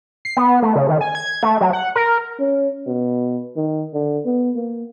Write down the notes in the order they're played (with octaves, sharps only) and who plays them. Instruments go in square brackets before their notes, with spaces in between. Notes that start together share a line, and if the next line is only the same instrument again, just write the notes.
[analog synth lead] C7
B3
A3
C#3
D#3
G#5
G#6
A3
F#3
F#5
A#4
[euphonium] C#4
B2
D#3
D3
B3
A#3